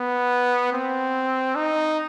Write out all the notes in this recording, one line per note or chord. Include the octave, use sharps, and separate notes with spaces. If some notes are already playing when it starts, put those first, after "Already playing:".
Already playing: B3
C4
D#4